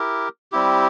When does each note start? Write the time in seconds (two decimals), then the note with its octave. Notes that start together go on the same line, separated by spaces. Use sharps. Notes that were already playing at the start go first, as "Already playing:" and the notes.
Already playing: E4 G4 A#4
0.52 G3 C4 E4 G4